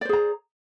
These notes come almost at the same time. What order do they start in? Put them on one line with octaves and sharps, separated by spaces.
D5 C5 G#4 A#5